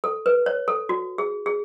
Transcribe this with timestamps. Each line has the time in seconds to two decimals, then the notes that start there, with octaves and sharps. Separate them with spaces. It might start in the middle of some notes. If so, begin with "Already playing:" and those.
0.04 A4
0.26 B4
0.46 C#5
0.68 A4
0.89 F#4
1.18 G#4
1.46 G#4